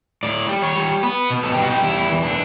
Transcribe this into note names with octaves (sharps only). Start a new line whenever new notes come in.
A2 D5
G3
C#5
G3
B3 B4
B2
A4
G3 G4
F#4
G4
E2 E4
E3
D4